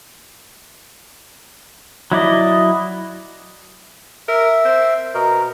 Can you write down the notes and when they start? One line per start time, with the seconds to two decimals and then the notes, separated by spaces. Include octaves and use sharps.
2.12 F#3 E4 D5 D#5
4.28 A#4 E5
4.65 C4
5.14 B2 A#4